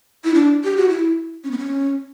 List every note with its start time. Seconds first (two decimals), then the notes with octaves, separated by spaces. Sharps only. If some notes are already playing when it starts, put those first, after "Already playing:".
0.24 E4
0.34 D4
0.64 G4
0.77 F#4
0.89 E4
1.44 C#4
1.51 B3
1.58 C#4